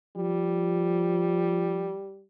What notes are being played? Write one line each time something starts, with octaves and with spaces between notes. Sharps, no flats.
F3 G3